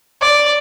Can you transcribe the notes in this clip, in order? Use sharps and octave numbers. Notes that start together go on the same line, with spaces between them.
D5